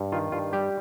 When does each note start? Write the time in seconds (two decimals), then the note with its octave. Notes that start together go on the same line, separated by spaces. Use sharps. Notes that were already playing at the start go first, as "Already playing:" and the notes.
Already playing: G2
0.12 D#3 F4
0.32 G2 F4
0.53 G3 G4